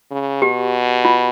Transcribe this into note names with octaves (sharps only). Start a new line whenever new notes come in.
C#3
B2 G4
F4